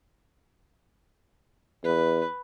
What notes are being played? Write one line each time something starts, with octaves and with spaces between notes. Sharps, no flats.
E2 B4